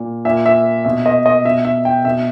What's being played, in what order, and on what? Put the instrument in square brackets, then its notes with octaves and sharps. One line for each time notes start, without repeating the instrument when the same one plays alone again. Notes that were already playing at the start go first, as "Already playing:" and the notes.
Already playing: [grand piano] A#2
A#2 E5
E5
B2 E5
D#5
D#5
B2 E5
E5
G5
B2 E5